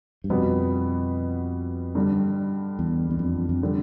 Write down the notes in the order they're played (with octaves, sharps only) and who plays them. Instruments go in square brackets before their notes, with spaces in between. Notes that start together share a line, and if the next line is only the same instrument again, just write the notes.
[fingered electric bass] G2
[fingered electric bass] F2 [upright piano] B2 G3 B3
[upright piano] G2 D3 G3
[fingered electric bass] E2
E2
F2
F2
[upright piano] D3 G3